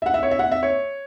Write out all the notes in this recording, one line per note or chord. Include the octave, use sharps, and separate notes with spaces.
E5
F#5
E5
C#5
E5
F#5
E5
C#5